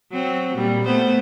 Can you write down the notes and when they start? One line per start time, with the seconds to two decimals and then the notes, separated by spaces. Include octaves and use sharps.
0.11 F#3 C4
0.55 A#2 G3
0.85 A3 B3 C5